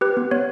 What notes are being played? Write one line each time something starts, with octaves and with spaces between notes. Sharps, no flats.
G4 B4
B3
B3 C#5